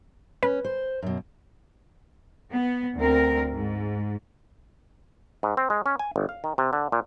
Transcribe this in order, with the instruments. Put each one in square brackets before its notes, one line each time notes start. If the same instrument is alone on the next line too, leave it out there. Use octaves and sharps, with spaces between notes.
[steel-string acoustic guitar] C#4 [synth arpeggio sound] B4
[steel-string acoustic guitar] C5
F#2 B2
[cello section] B3
D2 C4 A#4
G#2
[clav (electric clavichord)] G#2
C4
G#3
C#4
G#5
G1
F5
D#3
C3
D3
A#2